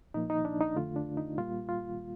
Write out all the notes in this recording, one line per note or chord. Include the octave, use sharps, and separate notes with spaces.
A#2 F3 A#3 D#4
D#4
D4
D#4
F2 D3 A3 F4
D4
D#4
A#2 G3 A#3 F4
F4